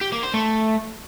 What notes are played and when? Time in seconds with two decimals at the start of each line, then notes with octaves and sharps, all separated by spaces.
0.01 G4
0.12 A#3
0.23 C5
0.34 A3